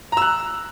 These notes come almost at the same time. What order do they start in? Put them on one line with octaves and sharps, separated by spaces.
A#5 E6 F#6